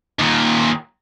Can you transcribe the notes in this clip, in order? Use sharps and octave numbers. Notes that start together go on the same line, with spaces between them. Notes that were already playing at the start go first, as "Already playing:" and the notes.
D#2 A#2